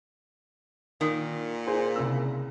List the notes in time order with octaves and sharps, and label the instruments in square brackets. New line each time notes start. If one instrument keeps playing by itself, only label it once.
[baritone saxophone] A#2 [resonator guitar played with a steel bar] D#3
[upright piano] G#4 C5 G#5
C2 C#3 E6